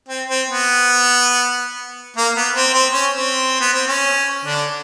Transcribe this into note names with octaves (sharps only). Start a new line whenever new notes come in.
C4
C4
B3
A#3
B3
C4
C4
C#4
C4
B3
C4
C#4
D3 D4